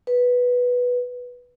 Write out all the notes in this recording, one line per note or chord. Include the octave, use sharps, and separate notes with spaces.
B4